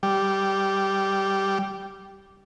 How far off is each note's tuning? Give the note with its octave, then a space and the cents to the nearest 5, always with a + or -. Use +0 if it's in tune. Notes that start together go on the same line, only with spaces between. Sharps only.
G3 -5